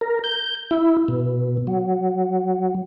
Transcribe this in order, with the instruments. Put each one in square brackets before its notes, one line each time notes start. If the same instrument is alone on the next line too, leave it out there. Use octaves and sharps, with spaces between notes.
[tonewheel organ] A#4
G6
E4
B2
F#3